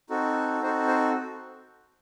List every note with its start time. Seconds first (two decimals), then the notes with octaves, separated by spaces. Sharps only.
0.10 C4 D#4 F#4 A4
0.61 C4 D#4 F#4 A4 C5
0.88 C5